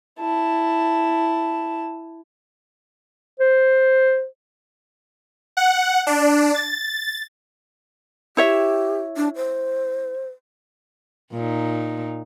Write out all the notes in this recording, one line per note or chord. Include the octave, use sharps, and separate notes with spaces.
E4 A5
C5
F#5
D4
A6
E4 G4 C#5 E5
D4
C5
A#2 D#4